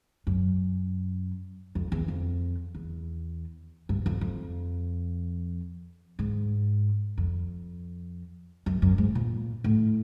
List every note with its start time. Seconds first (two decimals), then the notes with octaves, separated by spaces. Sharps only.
0.27 F#2
1.75 F2
1.92 E2
2.08 F2
2.75 E2
3.89 G2
4.06 F2
4.21 F2
6.19 G#2
7.18 F2
8.66 F#2
8.82 F#2
8.98 G#2
9.15 A#2
9.64 A2